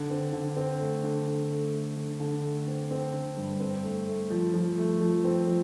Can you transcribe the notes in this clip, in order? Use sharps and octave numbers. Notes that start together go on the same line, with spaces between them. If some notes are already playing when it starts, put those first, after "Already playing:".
Already playing: D3
C4
D3
C4
A3
D3
D3
A3
A3
D3
D3
A3
C4
C4
D3
G2
C4
A3
A3
F3
F3
A3
F3
C4
F3